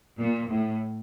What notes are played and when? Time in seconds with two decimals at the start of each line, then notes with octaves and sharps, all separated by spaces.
0.19 A#2
0.50 A2